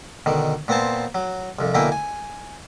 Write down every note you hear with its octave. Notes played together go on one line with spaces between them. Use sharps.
B2 D3 D#3
A#2 B3 C4 C5 A5
F#3
C2 F2
B2 D3 A#3 E4 G5 G#5
G#5